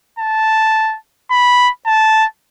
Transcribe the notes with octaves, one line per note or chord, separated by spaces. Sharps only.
A5
B5
A5